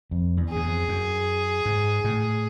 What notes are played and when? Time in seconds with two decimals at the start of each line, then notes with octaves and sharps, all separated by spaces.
0.11 F2
0.37 E2
0.50 G#4
0.56 F#2
0.63 F2
0.89 F#2
1.66 G#2
2.04 A2